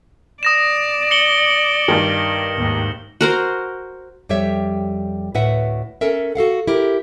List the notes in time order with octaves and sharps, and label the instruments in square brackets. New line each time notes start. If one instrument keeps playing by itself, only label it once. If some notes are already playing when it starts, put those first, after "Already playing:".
[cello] D5 [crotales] D#6 A#6 E7
[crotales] C#7 F#7 G7
[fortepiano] G2 D#3
[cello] D#2 G#2
[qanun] F#4 A#4 C5
[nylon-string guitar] F2 G3 G4 C#5 E5
D2 A2 B4 E5 F#5
C#4 A4 A#4 E5
F#4 A4 F5 F#5
E4 G4 A#4